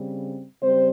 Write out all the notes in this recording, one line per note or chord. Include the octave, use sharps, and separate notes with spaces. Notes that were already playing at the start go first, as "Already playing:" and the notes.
Already playing: C#3 G3 C4
C#3 G3 C4 C5